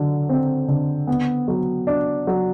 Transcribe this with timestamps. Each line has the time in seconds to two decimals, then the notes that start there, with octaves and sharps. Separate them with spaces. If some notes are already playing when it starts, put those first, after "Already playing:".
Already playing: D3 F#3
0.29 C4
0.68 D3
1.07 B3
1.48 F#3
1.87 D4
2.27 F#3